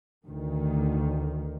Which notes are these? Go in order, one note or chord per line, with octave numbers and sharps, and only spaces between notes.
D2 D#3